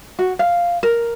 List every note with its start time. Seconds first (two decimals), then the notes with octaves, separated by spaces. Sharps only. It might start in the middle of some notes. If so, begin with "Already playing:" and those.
0.19 F#4
0.39 F5
0.83 A#4